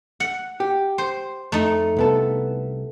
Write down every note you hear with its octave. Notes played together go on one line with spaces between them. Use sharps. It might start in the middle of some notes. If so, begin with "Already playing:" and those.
F#5
G4
C5
F2 A3 D#4
C2 B3 A4